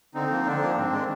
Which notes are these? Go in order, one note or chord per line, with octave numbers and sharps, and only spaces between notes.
D3 C4 D#4
F3 A#3
D3 D4
F3 A#3
G#2 C4
D#3 G#3 D4